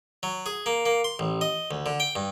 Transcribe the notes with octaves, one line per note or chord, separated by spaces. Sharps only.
F#3
G#4
A#3
A#3
C6
A1
D#5
D2
D3
G5
G2